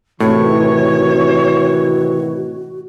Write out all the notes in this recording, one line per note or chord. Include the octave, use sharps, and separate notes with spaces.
A2 C3 D#3 E3 F#4 C#5